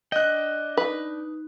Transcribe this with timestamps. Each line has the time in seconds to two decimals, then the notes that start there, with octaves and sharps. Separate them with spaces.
0.12 D4 D#5 G5 F#6
0.77 D#4 B4